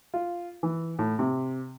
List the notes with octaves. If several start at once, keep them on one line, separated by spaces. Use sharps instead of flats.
F4
E3
A2
C3